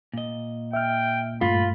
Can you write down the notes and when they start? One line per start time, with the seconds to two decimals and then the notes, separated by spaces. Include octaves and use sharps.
0.13 A#2 D#5
0.73 E5 G5 F6
1.41 G2 A3 F4 B5